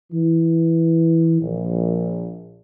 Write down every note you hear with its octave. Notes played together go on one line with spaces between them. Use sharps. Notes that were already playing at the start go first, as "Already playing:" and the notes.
E3
A#1